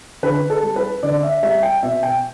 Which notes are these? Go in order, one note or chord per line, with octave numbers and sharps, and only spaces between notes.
D3 B4
A4
G3
B4
D3 D5
E5
G3 E5
G5
B2 E5
G5